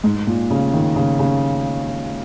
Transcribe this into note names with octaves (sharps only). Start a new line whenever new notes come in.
G#2
A#2
C#3
D#3
C#3
C#3